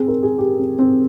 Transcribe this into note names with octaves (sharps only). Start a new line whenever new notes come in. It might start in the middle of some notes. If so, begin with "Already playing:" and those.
Already playing: C4 G#4
A#4
G#4
G4
C4
C4